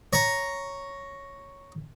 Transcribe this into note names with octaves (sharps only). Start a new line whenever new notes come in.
C#5 A#5